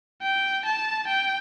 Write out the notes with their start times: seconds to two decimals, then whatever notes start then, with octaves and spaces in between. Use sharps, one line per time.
0.22 G5
0.65 A5
1.08 G5